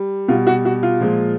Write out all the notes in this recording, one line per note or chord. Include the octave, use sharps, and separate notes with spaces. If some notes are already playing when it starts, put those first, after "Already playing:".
Already playing: G3
B2 G3 F4
F#4
F#4
F4
A#2 F3 G#3